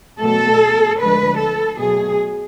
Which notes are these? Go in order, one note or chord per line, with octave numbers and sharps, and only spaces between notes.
B2 F#3 A3 A4
D2 D3 F3 G#3 B4
A4
B2 F#3 A3 G#4